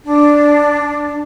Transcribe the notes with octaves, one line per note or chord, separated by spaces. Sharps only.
D4